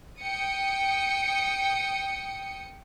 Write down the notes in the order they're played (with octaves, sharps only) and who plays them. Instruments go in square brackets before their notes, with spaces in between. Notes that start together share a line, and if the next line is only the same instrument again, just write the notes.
[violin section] G5 D#6 C#7